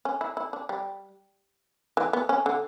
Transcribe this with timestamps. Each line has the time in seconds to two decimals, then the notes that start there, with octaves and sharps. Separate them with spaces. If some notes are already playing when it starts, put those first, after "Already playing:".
0.05 C#4
0.21 E4
0.37 E4
0.53 D4
0.69 G3
1.97 E3
2.13 B3
2.29 C#4
2.46 D3